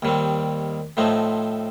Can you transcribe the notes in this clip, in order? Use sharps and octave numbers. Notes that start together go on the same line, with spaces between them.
D#2 D#3 G3 C4
A2 F3 A3 C4 D#4